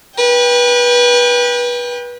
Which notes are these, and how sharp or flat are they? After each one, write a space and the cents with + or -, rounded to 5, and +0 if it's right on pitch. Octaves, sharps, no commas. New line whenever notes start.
B4 -25 G5 +25